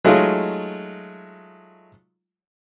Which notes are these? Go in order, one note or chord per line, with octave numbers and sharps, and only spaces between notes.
F#3 G#3 A3 D#4 F4